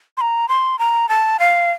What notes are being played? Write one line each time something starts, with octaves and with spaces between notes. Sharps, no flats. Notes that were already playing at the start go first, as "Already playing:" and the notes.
C6
A#5
C6
A#5
A5
F5